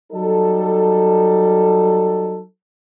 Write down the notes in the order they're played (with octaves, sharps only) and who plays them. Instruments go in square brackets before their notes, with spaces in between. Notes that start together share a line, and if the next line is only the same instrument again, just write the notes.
[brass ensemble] F#3 G3 D#4 A4